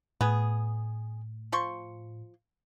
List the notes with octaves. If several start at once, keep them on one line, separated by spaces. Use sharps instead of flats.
A2 B3 G#4
F3 C6 C#6